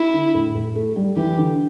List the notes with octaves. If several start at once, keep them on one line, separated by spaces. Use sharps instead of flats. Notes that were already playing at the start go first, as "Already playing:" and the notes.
Already playing: E4
D3
A2
A2
A3
G3
E3 G4
D3